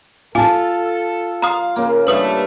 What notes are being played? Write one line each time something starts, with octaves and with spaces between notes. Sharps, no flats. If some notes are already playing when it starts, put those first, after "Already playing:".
F4 A4 G#5 A5 D6
F5 A#5 C6 D#6
C#3 A#3
G2 E3 A3 B4 F5 D#6 F#7